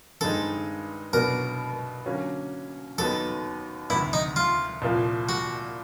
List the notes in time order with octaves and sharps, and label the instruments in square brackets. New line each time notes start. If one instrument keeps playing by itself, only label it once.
[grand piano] G2 D#3 G#3 C4 D#4 [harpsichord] A4
[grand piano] C2 B2 F#3 B3 D4 [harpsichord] A#4
[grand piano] D3 F#3 A#3 C#4
[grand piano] D#2 D#3 F#3 B3 D#4 [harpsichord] A4
[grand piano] D2 C3 D#3 [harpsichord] E4
[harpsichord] D#4
F4
[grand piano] C2 A#2 F3 A#3
[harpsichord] F#4